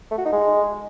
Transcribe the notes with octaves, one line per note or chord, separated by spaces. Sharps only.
A3
F#4
D#4
G#3